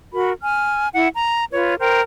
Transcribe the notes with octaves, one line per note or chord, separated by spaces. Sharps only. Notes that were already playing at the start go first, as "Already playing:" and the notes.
F#4 A#4 B5
G#5 F6
E4 F#5
A#5
F4 B4 C#5
A#4 C5 G5